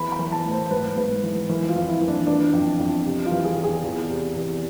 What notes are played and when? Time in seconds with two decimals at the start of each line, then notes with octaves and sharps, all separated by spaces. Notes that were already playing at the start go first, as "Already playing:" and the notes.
Already playing: E2 E3 B5
0.12 B5
0.19 E3
0.32 A5
0.45 A2
0.51 C5
0.71 G#2 B4
0.97 G#2 B4
1.23 E3
1.49 E3
1.68 F4
1.76 F2
1.88 E4
2.01 E3
2.08 D4
2.27 E3 D4
2.53 F2
2.79 F2
3.06 C3
3.25 F4
3.31 E3
3.44 G#4
3.58 E2
3.64 G#4
3.83 E2
4.10 C3
4.36 E2